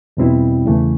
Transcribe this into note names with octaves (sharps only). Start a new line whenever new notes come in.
E2 B2 G3 C4 E4
E2 C#3 E3 A3